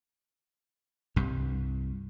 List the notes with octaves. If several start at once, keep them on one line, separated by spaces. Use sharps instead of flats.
C2 G2